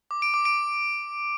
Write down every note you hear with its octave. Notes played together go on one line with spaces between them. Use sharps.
D6
D7
D6
D7